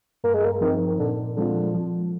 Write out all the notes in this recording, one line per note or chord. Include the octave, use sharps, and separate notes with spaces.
G2 A#3
G#3
A#3
D#3 F3 C4 D#4
A#2 D3
D3 F3 G#3 C4 F4
F3